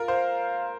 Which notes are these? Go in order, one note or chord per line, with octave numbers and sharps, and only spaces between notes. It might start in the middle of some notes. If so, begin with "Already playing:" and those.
Already playing: F4 A#4
C5 F5